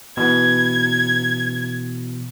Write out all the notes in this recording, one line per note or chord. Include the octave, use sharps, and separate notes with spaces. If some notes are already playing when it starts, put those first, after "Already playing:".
B2 E3 B3 G#6